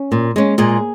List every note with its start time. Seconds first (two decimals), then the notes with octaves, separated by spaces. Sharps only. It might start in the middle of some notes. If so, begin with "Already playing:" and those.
Already playing: C#4
0.12 A#2
0.36 G#3 C#4
0.58 A#2 G#3 G#4